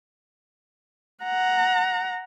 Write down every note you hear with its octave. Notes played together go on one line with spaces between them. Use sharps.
F#5 A#5